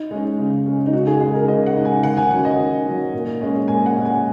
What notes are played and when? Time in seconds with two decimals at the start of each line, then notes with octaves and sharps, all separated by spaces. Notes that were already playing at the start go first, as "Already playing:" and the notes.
Already playing: D#4
0.11 G#3 C#4
0.38 C#3
0.66 G#3 C#4
0.86 D#4
0.93 C#3 F#4
1.07 G#4
1.20 G#3 D#4 G#4
1.34 A#4
1.48 C#3 D#5
1.66 F#5
1.76 G#3 D#4
1.85 G#5
2.03 D#3 F#5
2.17 G#5
2.31 F#3 C#4 F#5
2.45 D#5
2.59 D#3
2.86 F#3 C#4
3.14 A#2
3.41 G#3 C#4
3.68 A#2 G#5
3.86 F#5
3.96 G#3 C#4
4.05 G#5